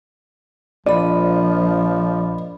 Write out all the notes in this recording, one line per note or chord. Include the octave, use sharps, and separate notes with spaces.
A#1 F3 D5 D#5 B5